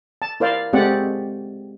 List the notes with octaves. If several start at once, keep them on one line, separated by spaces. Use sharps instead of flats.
A5
E4 A#4 C5 D5 F5
G#3 A3 C4 G4 D5 F#5